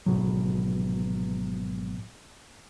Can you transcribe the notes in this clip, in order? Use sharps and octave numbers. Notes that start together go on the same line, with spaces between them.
G#1 B2 F#3